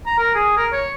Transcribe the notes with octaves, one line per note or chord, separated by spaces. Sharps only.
A#5
A#4
G#4
A#4
C#5